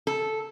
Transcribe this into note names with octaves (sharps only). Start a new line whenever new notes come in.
A4